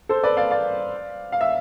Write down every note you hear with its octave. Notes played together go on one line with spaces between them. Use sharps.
A4 C5
B4 D5
D5 F5
D5 F5
F5
E5